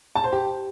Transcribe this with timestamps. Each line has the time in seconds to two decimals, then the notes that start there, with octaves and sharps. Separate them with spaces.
0.15 A5
0.24 C5
0.32 G4